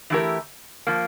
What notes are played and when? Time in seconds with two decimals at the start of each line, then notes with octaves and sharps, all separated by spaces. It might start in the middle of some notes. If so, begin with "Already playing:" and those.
0.10 E3 A3 E4 G4 A#4
0.87 F3 A#3